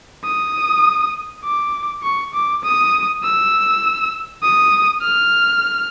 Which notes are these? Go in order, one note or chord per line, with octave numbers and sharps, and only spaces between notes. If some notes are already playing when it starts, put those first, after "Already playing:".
D#6
D6
C#6
D6
D#6
E6
D#6
F6